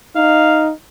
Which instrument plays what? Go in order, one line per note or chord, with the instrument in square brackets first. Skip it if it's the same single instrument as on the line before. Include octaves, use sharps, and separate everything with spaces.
[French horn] D#4 [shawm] F5